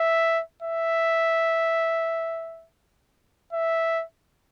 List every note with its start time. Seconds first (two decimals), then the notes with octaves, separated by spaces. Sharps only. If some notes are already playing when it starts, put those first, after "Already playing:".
Already playing: E5
0.63 E5
3.53 E5